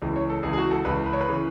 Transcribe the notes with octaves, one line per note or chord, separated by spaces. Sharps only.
C#2 C#3 E3
C#5
A4
C#2 C#3 E3 G#4
G#4
F#4
A4
C#2 C#3 E3 B4
B4
C#5
B4
C#3 E3